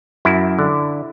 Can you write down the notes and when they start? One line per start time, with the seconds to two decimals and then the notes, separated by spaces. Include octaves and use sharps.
0.25 F#2 E4
0.59 D3